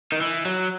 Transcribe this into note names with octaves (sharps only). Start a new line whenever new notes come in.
D#3
E3
F#3